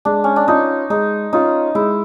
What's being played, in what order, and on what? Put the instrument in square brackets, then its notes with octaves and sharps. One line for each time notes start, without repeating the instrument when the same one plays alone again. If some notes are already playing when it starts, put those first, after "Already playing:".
[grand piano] G#3 [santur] D4
[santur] C#4
D4
[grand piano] C#4 F4 [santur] D#4
[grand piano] G#3 [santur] D#4
[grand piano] C#4 F4 [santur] D#4
[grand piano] G#3 [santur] E4